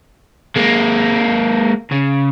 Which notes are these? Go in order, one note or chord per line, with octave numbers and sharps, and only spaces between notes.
G#3 A#3
C#3